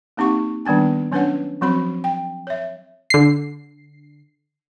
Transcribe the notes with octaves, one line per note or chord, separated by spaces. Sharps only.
A#3 C4 D#4 G4 F#5 C#6
D#3 G3 B3 D4 G#5
F#3 C#4 D4 B4 C#5 F#5
F3 F#3 C4 F#4 B5
G5
C#5 E5
D3 C7